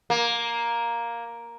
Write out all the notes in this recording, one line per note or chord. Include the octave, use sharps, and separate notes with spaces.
A#3